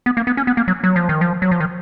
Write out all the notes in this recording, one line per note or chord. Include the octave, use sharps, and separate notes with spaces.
B3
A#3
B3
C#4
B3
A#3
F#3
F#3
F3
D#3
F3
F#3
F3
D#3